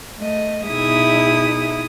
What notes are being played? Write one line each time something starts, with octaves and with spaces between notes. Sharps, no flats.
A3 D#5
B2 D#4 E4 G#4 E5 D#6